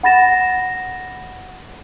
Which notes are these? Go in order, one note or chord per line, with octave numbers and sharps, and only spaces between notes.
F#5 B5 A6 A#6 E7